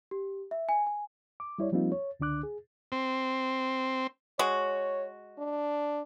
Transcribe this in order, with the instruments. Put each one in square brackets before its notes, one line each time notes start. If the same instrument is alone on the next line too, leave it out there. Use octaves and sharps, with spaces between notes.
[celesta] G4
E5
G#5
G#5
[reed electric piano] D6
G3 E4 C#5 D5
F3 G3 A#3 C4 D#4 F4
C#5
C#2 D3 D4 D6 F#6
G#4
[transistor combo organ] C4
[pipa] G#3 F#4 [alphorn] C#5
[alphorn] D4